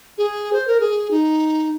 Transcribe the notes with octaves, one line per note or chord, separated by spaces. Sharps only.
G#4
C5
A#4
G#4
D#4